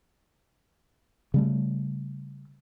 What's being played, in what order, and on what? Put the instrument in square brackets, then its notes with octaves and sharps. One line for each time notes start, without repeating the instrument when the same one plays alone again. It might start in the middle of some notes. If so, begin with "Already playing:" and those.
[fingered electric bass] C#3 G3 A3